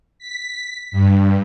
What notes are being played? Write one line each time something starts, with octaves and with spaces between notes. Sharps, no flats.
B6
G2